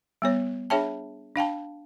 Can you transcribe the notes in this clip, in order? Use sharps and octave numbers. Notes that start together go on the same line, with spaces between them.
G3 B3 C#5
D4 G#4 C#5 E5 G5 A5
D4 F5 G5 A5